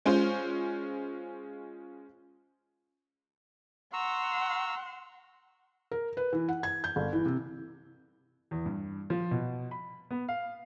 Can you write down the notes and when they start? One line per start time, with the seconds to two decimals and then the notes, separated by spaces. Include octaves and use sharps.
0.06 G#3 C#4 F4 C5
3.93 F#5 A#5 C6 C#6 E6
5.91 A#4
6.17 B4
6.33 E3
6.49 F#5
6.63 G#6
6.84 G6
6.96 G1
7.13 E3
7.26 C3
8.51 E2
8.66 G2
9.10 F3
9.31 B2
9.71 B5
10.11 B3
10.29 F5